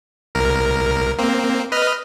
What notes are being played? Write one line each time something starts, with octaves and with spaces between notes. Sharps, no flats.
C2 A#4
A#3 C4
B4 D#5 F6